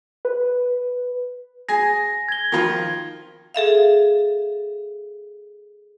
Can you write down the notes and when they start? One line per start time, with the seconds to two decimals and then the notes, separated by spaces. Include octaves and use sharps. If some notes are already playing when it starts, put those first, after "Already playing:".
0.25 B4
1.69 G#4 G#5 A#6
2.28 G#6 G7
2.52 D#3 F3
3.54 G#4 A4 E5 F5